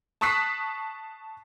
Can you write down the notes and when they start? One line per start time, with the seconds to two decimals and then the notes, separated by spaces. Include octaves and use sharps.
0.21 A5 C#6 D#6 F#6 B6 C7